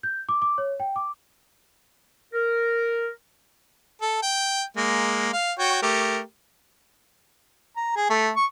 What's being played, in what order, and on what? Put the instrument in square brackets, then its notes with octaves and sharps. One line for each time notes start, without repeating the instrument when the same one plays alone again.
[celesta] G6
D6
D6
C#5
G5
D6
[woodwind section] A#4
[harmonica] A4
G5
G#3 A#3
F5
F#4 C#5 G5
A3 G4 A#4
A#5
G#4
A3
C#6